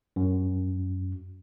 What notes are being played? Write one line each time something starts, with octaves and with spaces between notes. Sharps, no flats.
F#2